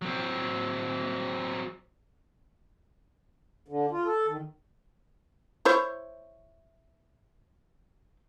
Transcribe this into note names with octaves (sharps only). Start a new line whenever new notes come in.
F#3 C4
D3
F4
A4
D#3
E4 C5 C#5